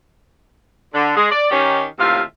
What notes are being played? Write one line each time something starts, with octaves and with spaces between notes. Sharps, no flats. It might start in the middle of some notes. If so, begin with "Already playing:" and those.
D3
G#3
D5
D#3 C#4 G4
D#2 A2 C3 F4 E5 F5